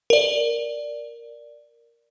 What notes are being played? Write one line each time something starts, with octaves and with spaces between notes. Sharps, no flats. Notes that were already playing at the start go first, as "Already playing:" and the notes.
A#4 D5